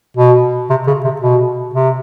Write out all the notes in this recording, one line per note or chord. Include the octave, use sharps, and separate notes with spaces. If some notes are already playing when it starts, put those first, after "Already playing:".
B2
C3
C#3
C3
B2
C3